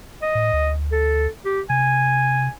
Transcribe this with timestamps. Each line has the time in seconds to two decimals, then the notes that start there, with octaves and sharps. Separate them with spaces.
0.22 D#5
0.35 A2
0.53 D2
0.92 A4
1.45 G4
1.70 C3 G#5